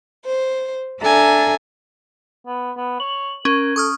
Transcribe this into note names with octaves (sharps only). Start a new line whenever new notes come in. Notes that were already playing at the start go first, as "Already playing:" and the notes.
C5
D4 A4 E5 G#5 A#5
B3
B3
C#5 F#7
C#4 A#4
A4 C#6 D#6 F6